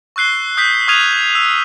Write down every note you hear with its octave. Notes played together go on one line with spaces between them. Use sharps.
C#6 E6 F#6 C7 G7
D#6 F#6 G6 B6
C#6 D#6 F6 G#6 D#7 F7
E6